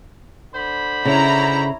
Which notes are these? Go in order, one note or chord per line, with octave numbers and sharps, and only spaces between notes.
D3 C5 B5
C#3 C#4 E4 A#5